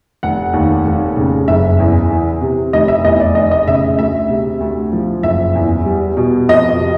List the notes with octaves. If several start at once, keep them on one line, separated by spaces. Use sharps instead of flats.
F1 F#5
D#2
F1
C#3
F#1 E5
E2
E3
C3
F1 D#5
E5
E2 D#5
D5
F1 D#5
D#5
C#3 E5
D2 E5
C3
D2
F3
F#1 E5
E2
G3
B2
F2 D#5
C3